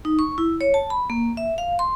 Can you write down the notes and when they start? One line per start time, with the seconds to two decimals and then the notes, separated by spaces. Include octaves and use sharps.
0.05 D#4
0.19 C#6
0.38 E4
0.61 C#5
0.74 A5
0.90 B5
1.10 A#3
1.37 E5
1.58 F5
1.79 C6